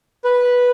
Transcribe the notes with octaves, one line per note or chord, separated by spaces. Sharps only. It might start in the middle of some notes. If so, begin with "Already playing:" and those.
B4